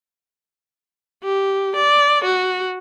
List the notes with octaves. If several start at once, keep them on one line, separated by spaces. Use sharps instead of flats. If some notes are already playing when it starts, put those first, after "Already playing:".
G4
D5
F#4